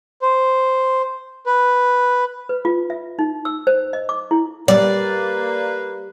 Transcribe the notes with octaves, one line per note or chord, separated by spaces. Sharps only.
C5
B4
B4
F4
E5
D#4
E6
C5
D#5
D6
E4
G3 A#3 B4 D5